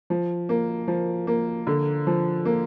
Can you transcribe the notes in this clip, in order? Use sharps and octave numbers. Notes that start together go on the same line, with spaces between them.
F3
A#3
F3
A#3
D3
F3
A#3